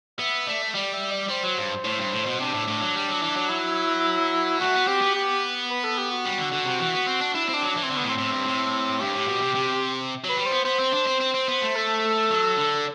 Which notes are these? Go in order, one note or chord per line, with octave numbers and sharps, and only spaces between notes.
B3 E5
A3 D5
E5
G3 D5
E5
D5
G3 C5
F#3
G2
A2
G2
A2
B2
C3 D4
A2
A2
F#3
G3
F#3
E3
F#3
E4
A3 F#4
B3
C4 G4
B3
G4
B4
A4
G4
F#4
G3
D3
D3
C3
E3
B3
C4
D4
D4 E4
C4
D4
F#3
D4
E3
C4
D3
B3
A2
C4
A2
G2
A2
G2 G4
A2
B2
C3
C3
F#3 B4
G3
C5
B3
B3 C5
C4
D4
C4
C4
C4
B3
A3
A4
F#3
D3